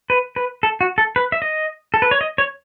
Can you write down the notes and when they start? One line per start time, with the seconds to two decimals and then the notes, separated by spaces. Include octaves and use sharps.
0.10 B4
0.36 B4
0.63 A4
0.81 F#4
0.98 A4
1.16 B4
1.32 E5
1.42 D#5
1.94 A4
2.02 B4
2.11 C#5
2.21 D#5
2.38 C#5